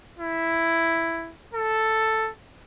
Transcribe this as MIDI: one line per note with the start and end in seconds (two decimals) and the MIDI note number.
0.18 1.33 64
1.53 2.31 69